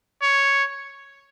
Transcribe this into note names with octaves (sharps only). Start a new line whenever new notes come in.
C#5